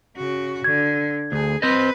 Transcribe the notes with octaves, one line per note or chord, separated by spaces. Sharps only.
C#3 F#4
D3 G#6
D2 G#4
C4 B4 C5 D#5